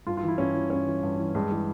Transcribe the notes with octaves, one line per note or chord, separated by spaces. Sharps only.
G2 F4
F4
E3
E4
G2 C#4
E3
G2 C#4
E3
G2
E3
G2 G#3
E3 G#3